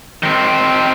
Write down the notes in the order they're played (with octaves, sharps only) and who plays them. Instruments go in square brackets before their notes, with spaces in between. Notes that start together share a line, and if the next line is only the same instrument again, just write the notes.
[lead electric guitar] D#3 C4